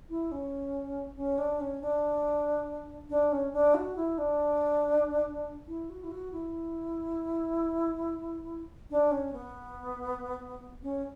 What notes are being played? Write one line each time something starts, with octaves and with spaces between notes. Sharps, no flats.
E4
C#4
C#4
D4
C#4
D4
D4
C#4
D4
F#4
E4
D4
E4
F#4
E4
F#4
E4
D4
C#4
B3
C#4